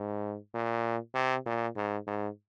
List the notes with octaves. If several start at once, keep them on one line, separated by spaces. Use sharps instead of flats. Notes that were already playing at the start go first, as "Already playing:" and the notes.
Already playing: G#2
A#2
C3
A#2
G#2
G#2